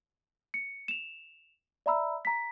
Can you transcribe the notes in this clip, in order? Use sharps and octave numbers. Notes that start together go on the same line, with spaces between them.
C#7
E7 F7
D5 E5 A#5 B5 E6
A#5 B6